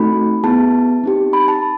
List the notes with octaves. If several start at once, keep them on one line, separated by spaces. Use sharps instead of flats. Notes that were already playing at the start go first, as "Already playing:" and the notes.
Already playing: A3 C4 D#4 F#4 A4 B5
B3 E4 G#4 A5
C4 D#4 G4
B5
A5